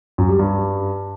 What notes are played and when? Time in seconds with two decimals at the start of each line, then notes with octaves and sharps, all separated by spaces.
0.18 F#2
0.29 G3
0.39 G2